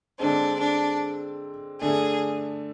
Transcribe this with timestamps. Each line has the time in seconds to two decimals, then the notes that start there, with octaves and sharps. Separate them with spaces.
0.19 D3 G#3 C4 D4
0.60 D4
1.81 D3 A3 D4 G#4